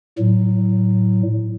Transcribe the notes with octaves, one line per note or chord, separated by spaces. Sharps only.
A2 F#3